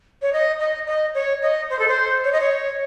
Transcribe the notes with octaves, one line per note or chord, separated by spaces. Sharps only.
C#5
D#5
D#5
D#5
C#5
D#5
C5
A4
C5
C#5
D#5
C#5